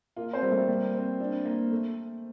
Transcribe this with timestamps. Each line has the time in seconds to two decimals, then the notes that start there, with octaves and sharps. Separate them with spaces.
0.16 A#3 F4 A#4
0.33 C4 C5
0.43 G3 A#4
0.51 A3 A4
0.68 G3 A#3 A#4
0.94 C4
1.20 D4
1.45 A#3
1.71 A3